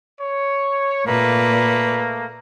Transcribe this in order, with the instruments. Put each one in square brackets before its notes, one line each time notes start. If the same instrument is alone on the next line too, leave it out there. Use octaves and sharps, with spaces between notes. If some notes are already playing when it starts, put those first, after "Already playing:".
[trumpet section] C#5
[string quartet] A#2 B4 [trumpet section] A3 A#3